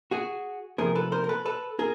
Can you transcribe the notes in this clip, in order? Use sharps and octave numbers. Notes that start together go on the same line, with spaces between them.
F#4 G#4
C3 F3 A3 G#4 A#4
A4 B4
A#4 C5
A#4
A4 B4
A4 B4
G#4 A#4